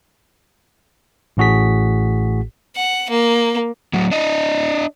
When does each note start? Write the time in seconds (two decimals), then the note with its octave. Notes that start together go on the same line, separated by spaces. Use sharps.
1.37 A1 A2 F#4 G#4 B6
2.76 F#5
3.10 A#3
3.93 A2 F#3
4.11 D4 D#5